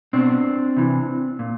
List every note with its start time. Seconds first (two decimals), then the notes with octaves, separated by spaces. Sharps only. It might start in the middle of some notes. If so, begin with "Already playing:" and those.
0.13 B2 C4 D4
0.77 C3 E3
1.39 A#2